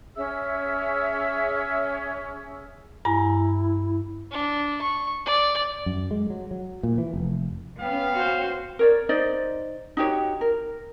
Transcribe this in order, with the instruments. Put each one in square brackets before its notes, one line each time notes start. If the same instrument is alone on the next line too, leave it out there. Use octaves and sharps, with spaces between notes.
[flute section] C#4 G#4 E5 E6
[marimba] G2 G#5 A#5 [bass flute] E4
[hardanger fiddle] D4
C#6
D5
[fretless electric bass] F#2
G#3
F#3
F#3
A#2
E3
F1
[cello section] B3 C#4 [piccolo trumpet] F5 [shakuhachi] G5
[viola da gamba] F#4 C5
[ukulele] A#4 C#5 D5
D#4 C5 D5 D#5
D#4 F#4 G4 C#5
A#4